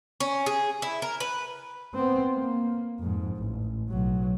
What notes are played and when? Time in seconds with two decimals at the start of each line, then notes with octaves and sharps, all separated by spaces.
0.20 C#4
0.46 G#4
0.82 E4
1.02 A#4
1.20 B4
1.95 B3 C4
2.33 A#3
3.00 F2 G#2
3.37 A1
3.89 B1 F#3